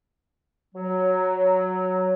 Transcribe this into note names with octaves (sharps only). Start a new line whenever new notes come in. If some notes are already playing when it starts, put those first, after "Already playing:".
F#3